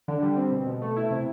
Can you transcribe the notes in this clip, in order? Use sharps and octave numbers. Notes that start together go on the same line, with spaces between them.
D3
G3
C4
B2
B2
A3
E4
C3